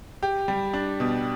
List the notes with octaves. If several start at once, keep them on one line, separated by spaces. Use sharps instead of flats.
G4
G3
D4
B2